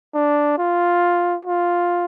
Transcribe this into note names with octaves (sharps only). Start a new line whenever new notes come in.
D4
F4
F4